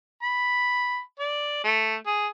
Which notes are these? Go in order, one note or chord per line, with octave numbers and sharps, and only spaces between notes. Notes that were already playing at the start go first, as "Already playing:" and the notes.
B5
D5
A3
G#4